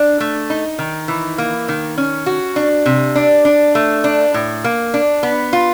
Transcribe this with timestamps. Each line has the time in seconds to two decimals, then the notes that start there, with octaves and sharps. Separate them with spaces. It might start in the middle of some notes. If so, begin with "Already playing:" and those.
Already playing: D4
0.20 A3
0.50 D#4
0.79 D#3
1.08 E3
1.38 A#3
1.68 D#3
1.98 C#4
2.26 F#4
2.56 D4
2.86 C3
3.15 D4
3.45 D4
3.75 A3
4.04 D4
4.34 A2
4.64 A#3
4.94 D4
5.23 B3
5.53 F4